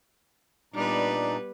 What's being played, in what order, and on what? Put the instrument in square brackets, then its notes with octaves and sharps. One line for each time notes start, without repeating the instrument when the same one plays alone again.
[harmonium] A#2 D4 D#4 [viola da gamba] G3 B3 B4